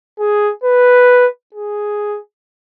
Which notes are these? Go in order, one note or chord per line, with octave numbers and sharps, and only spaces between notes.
G#4
B4
G#4